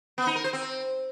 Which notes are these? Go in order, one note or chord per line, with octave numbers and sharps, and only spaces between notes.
B3
D#4
A#4
C5
C4